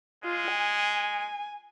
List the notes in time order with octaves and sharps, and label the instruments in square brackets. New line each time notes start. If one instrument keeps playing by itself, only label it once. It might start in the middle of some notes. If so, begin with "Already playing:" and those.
[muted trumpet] G#3 [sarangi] F4
[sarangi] G#5